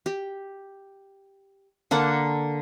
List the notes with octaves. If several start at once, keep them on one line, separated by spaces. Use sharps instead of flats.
G4
D3 A#3 A4 F#5